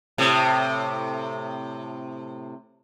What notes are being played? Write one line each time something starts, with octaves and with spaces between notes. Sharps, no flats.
A2 C3